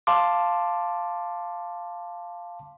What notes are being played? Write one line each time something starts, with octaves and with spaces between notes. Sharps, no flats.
F5 A5 C6 D6